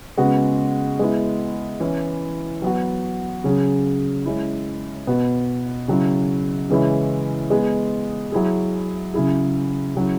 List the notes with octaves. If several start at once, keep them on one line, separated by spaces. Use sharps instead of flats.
C#3 G#3 B3 F#4
G#3 B3 E4
E3 C#4 E4
F#3 B3 F#4
C#3 F#3 C#4 G#4
G#3 C#4 E4
B2 B3 F#4
C#3 F#3 E4
C#3 E3 G#3 C#4 E4
G#3 B3 G#4
F#3 E4 G#4
C#3 F#3 E4 G#4
C#3 F#3 E4